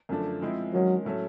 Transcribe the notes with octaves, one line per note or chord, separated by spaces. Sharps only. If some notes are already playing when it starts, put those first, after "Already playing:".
F#2 D3 F3 A3 D4
F3 G#3 C4 E4
D#3 F#3 G#3 C#4
A2 F#3 A3 C#4